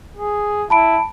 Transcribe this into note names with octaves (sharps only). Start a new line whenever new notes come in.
G#4
E4 A5 B5 D7